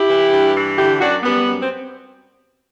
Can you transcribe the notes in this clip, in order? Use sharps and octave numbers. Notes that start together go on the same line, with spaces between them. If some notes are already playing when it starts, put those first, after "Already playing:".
Already playing: E4 G4
E3
G2
E3
D3 E4 G4
F#2 D4 F#4
F#2 G3 B3
F#2
C4